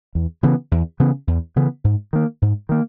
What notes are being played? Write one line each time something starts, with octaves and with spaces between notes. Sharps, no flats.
E2
C#3 E3 B3
E2
C#3 E3 B3
E2
C#3 E3 B3
G#2
D#3 A#3
G#2
D#3 A#3